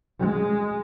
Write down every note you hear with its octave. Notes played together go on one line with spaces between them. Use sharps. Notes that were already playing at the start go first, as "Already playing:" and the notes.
G#3